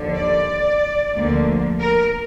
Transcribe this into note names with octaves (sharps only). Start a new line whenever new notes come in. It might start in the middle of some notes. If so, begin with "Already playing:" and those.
Already playing: D#2 D3 F3
D5
D2 D3 F3 A#3
A#4